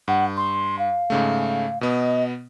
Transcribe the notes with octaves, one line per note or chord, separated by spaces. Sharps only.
G2 F#5
C6
F5
G#2 C#3 A3
B2 B3 D#5